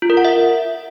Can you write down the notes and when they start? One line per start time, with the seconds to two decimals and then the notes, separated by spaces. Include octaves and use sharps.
0.02 F4
0.10 A#4
0.17 F#5
0.25 E5